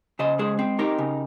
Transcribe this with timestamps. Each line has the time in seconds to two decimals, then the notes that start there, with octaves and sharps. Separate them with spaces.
0.19 C#3 C5 D#5
0.39 G#3 G#4 C5
0.59 C4
0.79 D#4 G4 A#4
0.99 C#3